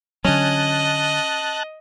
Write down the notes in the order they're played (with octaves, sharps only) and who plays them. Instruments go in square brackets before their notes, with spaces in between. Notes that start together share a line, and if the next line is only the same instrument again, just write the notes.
[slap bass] D3 F#3 [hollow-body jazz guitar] C#4 [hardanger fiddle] D#5 [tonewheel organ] A5 F#6